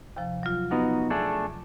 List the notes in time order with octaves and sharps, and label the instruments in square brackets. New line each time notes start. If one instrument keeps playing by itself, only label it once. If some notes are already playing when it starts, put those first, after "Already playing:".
[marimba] D#2 C3 F3
F#3 F4
[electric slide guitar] B3 D#4 F#4
A3 D4 G#4